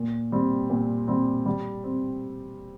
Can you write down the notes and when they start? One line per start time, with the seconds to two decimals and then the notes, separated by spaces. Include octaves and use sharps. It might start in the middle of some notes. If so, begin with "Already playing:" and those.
Already playing: A#2
0.32 G3 C4
0.70 A#2
1.08 G3 C4
1.46 G3
1.84 C4